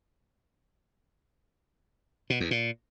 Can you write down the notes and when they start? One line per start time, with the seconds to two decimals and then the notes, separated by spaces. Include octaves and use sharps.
2.30 B2
2.40 E2
2.51 A#2